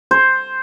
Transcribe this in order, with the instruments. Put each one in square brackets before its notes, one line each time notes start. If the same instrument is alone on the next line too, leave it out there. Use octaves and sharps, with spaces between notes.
[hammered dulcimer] C5